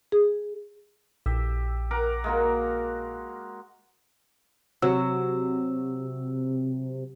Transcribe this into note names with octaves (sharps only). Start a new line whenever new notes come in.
G#4
A#1 G4 E6
A#4 F#5 D6
G#3 A#3 F#4
C3 F#3 E6